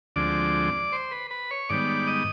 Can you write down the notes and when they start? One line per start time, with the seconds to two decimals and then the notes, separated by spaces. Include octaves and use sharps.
0.16 D2 D3 F3 G#3 C4 D5 D6
0.92 C5 C6
1.11 B4 B5
1.30 B4 B5
1.51 C#5 C#6
1.69 G#2 D#3 G3 B3 D5 D6
2.07 D#5 D#6